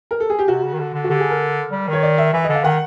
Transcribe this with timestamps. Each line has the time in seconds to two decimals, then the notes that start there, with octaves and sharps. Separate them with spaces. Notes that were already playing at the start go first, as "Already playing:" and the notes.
0.11 A#4
0.20 A4
0.30 G#4
0.39 G4
0.48 C3 F#4
0.64 C#3
0.73 D#3
0.79 D3
0.94 D3
1.04 F#4
1.10 D3 G4
1.20 G#4
1.30 A#4
1.72 G3
1.88 D#3
1.93 C#5
2.03 D5
2.18 E5
2.34 E3 E5
2.44 D#5
2.49 D3
2.54 F5
2.64 D#3 F#5